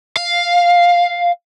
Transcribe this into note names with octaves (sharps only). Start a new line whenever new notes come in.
F5